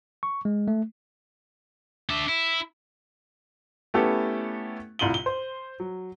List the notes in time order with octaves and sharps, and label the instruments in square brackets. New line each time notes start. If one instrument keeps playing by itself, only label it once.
[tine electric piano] C#6
G#3
A3
[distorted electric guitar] D4 E5
E4
[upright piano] A3 B3 C#4 E4 G4 A4
C2 A2 F4 D#7 F#7 G7
G7
C5
F#3